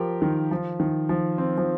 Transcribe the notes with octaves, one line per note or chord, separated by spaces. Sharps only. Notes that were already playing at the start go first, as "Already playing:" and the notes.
Already playing: F3 F4 G4 A#4
D#3
F3
D#3
F3
C4
F3